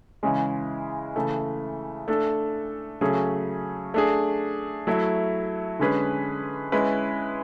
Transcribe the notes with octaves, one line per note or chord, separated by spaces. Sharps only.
C#3 E3 G#3 C#4
C#3 E3 A3
A3 D4 A4
C#3 F#3 A3 C#4 G#4
A3 D4 G#4
F#3 A3 E4
D3 G#3 C#4 G#4 B4
G#3 C#4 E4 B4